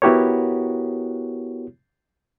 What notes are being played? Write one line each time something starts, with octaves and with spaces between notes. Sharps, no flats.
B3 E4 F#4 G4 A#4 C#5